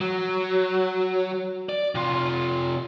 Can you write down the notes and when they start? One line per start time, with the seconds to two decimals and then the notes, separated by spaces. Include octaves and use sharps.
0.01 F#3
1.69 D5
1.95 C3 F4